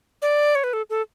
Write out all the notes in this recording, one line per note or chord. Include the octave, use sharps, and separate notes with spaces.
D5
C#5
B4
A4
A4